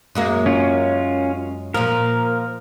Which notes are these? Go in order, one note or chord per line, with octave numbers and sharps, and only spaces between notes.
F#2 G#3 A#3
C#4 F4
A#2 F3 A#4